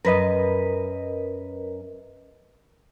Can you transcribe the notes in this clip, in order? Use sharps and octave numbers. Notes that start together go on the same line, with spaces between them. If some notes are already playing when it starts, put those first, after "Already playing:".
F#2 A#4 B4 D#5